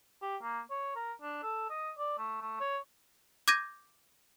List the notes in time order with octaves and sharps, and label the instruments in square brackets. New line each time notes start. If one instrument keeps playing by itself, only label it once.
[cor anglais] G4
A#3
C#5
A#4
D4
A4
D#5
D5
A3
A3
C#5
[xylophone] D6 G6 G#6 A#6 D#7